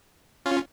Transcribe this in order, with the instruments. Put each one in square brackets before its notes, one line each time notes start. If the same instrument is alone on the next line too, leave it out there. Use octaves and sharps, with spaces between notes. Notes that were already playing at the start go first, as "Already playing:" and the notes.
[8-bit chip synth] C#4 F4